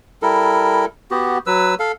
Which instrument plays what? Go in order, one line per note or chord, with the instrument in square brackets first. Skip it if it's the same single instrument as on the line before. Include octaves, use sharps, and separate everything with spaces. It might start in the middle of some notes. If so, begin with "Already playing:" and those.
[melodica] G3 E4 A4 A#4
B3 F#4 G4
F#3 B4 E6
A4 F5